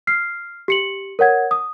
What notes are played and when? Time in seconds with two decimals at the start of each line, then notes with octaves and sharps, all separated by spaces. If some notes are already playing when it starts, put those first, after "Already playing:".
0.07 F6 C7
0.68 G4 C#7 F#7
1.19 A#4 C#5 F#5 G#6
1.51 D#6